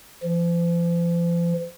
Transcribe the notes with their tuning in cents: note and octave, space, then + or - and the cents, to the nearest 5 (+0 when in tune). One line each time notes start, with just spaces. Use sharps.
F3 -40